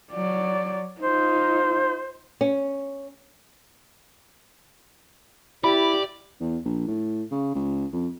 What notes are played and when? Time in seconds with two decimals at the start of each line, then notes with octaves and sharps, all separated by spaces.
0.12 F#3 D5
1.01 D#4 F4 C5
2.41 C#4
5.64 E4 G4 D5 B5
6.41 E2
6.65 A#1
6.87 A2
7.31 C#3
7.55 C#2
7.93 F2